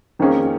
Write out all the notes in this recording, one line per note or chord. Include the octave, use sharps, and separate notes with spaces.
F2 D#3 A#3 C#4 G#4